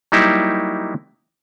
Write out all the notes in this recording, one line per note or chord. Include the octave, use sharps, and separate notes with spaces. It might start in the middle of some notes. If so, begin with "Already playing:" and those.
F#3 G3 A#3 D#4 E4 G4